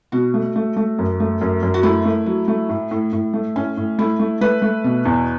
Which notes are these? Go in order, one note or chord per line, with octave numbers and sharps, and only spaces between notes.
B2 F#4
A3
A3
A3
F#2
A3
F#2
F#2
F#4
A3 E4
A3
F#3
A3
A2
A2
A2
A3
A2 C#4
A2
A3 E4
A3
A3 B4
A3
B2
E2